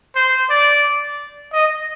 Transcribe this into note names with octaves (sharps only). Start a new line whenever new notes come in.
C5
D5
D#5